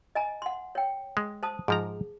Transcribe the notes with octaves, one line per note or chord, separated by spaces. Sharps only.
D#5 G#5 A#5
F#5 C6
C#5 G5
G#3
C5 A5 D#6
G#2 F3 G#4 A#5